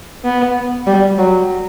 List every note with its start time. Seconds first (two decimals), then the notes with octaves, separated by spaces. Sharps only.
0.24 B3
0.87 G3
1.18 F#3